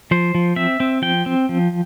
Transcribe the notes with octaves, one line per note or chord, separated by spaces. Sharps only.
F3 C5
F3
C4 E5
C4
F3 G5
C4
F3